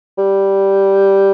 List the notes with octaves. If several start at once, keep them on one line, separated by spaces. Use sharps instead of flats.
G3